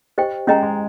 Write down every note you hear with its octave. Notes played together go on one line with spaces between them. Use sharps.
G4 C5 D#5 G5 C#6
G#3 C#4 G#4 D#5 G5 A#5
G#3